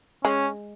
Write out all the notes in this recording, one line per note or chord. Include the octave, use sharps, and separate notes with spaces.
G#3 C#4